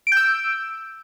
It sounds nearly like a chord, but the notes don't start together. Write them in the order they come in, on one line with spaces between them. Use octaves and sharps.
D7 G6 E6